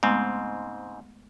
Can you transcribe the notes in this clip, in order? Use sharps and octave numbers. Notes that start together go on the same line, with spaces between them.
G#2 C#3 G#3 A3 B3 C4